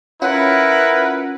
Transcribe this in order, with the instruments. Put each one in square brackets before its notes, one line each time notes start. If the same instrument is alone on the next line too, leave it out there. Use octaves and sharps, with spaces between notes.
[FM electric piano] C#4 F4 [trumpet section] E4 A#4 B4 [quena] F#5